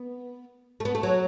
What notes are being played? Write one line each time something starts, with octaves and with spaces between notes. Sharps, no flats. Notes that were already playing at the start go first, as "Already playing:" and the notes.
Already playing: B3
A3
B3
A3
F#3